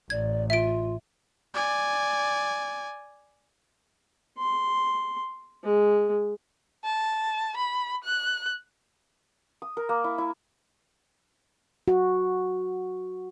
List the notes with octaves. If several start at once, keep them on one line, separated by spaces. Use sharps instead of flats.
A1 D5 G#6
F4 E5 D7
D5 G#5
C6
G#3
A5
B5
F#6
D#6
A#4
A#3
E4
E4
F#4